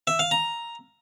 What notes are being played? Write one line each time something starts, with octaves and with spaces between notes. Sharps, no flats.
E5
F5
A#5